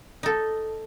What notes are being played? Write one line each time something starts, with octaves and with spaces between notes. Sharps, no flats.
D#4 A4